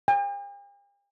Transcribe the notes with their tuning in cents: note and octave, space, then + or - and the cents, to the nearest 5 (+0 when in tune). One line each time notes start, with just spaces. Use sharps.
G5 +45